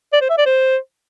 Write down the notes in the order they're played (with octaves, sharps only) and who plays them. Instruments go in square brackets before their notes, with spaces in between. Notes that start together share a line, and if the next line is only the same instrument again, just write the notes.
[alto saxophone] D5
C5
E5
D5
C5